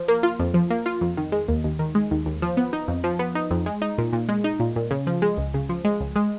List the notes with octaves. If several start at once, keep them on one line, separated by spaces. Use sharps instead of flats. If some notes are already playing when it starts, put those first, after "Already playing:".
Already playing: F3
A#3
F4
F2
F3
A#3
F4
F2
D#3
G#3
D#2
D#2
D#3
G#3
D#2
D#2
F3
B3
D#4
F2
F3
B3
D#4
F2
G#3
D#4
A#2
A#2
G#3
D#4
A#2
A#2
C#3
F3
G#3
C#2
C#3
F3
G#3
C#2
G#3